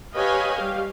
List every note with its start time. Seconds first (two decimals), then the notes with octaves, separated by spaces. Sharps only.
0.15 G4 B4 C#5 D#5 F5 G#5
0.56 G3 G4 F5